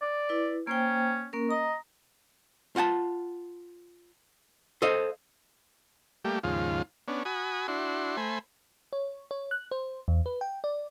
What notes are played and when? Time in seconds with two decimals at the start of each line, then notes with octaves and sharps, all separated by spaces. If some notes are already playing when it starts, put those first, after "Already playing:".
0.02 D5
0.29 E4 B4
0.67 A#3 C#4 C5 G5
1.33 A#3 C#4 A#4
1.51 D#5 A#5
2.76 F4 F#5 G5 A5
4.82 A4 C5 D#5 F5
6.25 G3 A3 A#3 G4
6.43 D#2 G#2 C#3 F3 F4
7.08 B3 C#4 D4
7.25 F#4 G#5 B5 D#6
7.68 D4 E4 F#4 C6
8.17 A3 C5 G#5 B5
8.93 C#5
9.31 C#5
9.51 F#6
9.71 C5
10.08 E2
10.26 B4
10.41 G5
10.64 D5